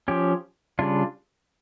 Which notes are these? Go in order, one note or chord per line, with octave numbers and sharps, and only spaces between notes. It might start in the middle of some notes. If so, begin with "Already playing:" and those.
F3 C#4 G4
C#3 G3 D4 F4